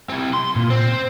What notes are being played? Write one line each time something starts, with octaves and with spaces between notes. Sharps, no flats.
C4 E4
C6
A#2
C4